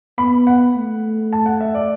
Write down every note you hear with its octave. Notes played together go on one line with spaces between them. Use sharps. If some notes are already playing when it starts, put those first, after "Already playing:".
B3 B5
F#5
A3
A5
F#5
E5
D5